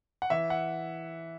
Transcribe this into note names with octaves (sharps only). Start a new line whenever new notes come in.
F#5
E3 E5
F#5